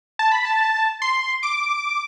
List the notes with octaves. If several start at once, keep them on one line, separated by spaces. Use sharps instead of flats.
A5
B5
A5
C6
D6